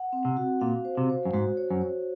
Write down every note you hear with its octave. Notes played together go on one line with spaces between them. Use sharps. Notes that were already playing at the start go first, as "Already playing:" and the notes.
Already playing: F#5
C4
C3
F#4
A#2 F5
C5
C3
C5
F#2
G#2 F#4
C#5
F#2
C#5